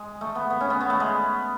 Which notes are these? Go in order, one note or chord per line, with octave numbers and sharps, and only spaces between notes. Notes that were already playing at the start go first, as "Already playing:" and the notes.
Already playing: G#3
A3
B3
B3
C#4
B3
B3
A3
G#3